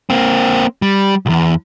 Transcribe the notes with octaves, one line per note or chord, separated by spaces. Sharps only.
A#3 C4
G3
B1 E2